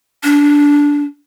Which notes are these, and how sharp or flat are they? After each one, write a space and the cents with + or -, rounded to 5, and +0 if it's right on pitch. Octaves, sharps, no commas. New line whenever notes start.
D4 -15